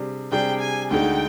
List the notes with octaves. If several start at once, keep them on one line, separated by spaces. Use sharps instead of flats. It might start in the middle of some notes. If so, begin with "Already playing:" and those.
Already playing: C3 G3 D4 G#4
C3 G3 D4 G#4 G5
G#5
D2 D3 G#3 D#4 G5